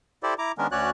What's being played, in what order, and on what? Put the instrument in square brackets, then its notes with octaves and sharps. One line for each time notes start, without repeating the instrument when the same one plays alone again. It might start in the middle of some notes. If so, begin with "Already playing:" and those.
[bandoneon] E4 G4 A4 C5 D5
E4 A#5 D6
D#3 G#3 B3 C#4 D4 A#4
D2 C#4 F#4 C#5 D5 F#6